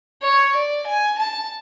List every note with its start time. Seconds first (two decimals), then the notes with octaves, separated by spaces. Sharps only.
0.22 C#5
0.55 D5
0.86 G#5
1.18 A5